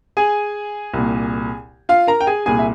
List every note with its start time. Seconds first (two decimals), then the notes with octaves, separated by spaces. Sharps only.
0.17 G#4 G#5
0.94 C2 A#2
1.89 F4 F5
2.08 A#4 A#5
2.21 G5
2.27 G#4 G#5
2.46 C2 A#2 G#4 G#5
2.59 E5